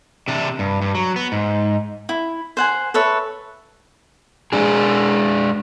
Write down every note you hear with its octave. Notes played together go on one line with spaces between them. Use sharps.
C3 D4
G2
G2
F#3
B3
G#2
E4
C5 F#5 G#5
A4 B4 C#5 E5
G#3 D4 G#4